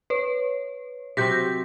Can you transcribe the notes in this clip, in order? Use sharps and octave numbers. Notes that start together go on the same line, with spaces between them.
B4 C#5
C3 F#3 C4 G6 A#6 B6